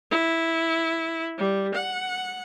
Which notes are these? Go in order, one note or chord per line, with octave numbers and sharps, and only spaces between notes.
E4
G3
F#5